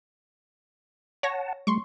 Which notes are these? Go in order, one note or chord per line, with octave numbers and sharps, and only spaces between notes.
C#5 F#5 A5 A#6
G3 A3 C6 C#6